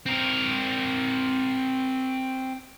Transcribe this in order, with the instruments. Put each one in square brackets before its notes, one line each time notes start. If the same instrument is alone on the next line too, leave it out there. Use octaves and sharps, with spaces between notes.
[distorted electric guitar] C4 A#4